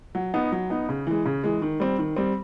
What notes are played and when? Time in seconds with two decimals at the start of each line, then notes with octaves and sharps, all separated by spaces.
0.15 F#3
0.34 B3 D#4
0.52 F#3
0.70 B3 D#4
0.89 C#3
1.07 E3 G#3
1.25 C#3
1.44 E3 G#3
1.62 D#3
1.80 G3 C4
1.99 D#3
2.17 G3 C4